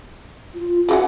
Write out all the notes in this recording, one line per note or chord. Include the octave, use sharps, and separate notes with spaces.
F4
C#3 E3 F#4 F#5